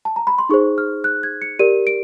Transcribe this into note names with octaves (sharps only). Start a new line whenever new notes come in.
A5
A#5
B5
C6
D#4 G#4 C5 C#6
F6
F#6
G#6
C#7
G4 A#4 D5 D#7
D7